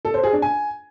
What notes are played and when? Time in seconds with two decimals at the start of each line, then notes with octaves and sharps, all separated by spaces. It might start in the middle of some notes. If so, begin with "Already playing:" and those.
0.05 A4
0.14 C5
0.23 G#4
0.33 D4
0.42 G#5